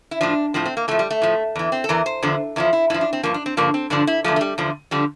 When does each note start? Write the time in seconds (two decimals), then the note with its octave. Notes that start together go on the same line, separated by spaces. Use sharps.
0.11 E4
0.21 A2 F3 D4
0.54 A2 F3 C4
0.65 C4
0.77 A#3
0.88 A2 A3
0.91 F3
0.99 G3
1.11 A3
1.22 A2 F3
1.56 E2 E3
1.72 C4
1.84 A4
1.89 E2 E3 A#4
2.06 C5
2.23 E2 D3 F3
2.56 E2 D3 F3 E4
2.73 E4
2.90 G2 E4
2.94 F3
3.01 D4
3.13 C4
3.23 G2 F3 A#3
3.34 D4
3.46 C4
3.57 G2 D3 F3 A#3
3.74 C4
3.90 G2 D3 F3 D4
4.07 E4
4.24 E2 D3 F3 A3
4.36 A3
4.41 G3
4.58 E2 D3 F3
4.91 D3 F3 G3